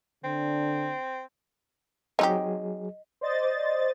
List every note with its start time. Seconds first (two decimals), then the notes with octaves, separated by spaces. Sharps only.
0.24 D3 C4 D4
2.19 F#3 C4 D#4 G4 G#4 D#5
3.21 C5 D5 D#5 A6